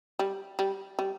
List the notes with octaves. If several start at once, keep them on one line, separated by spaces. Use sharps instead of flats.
G3
G3
G3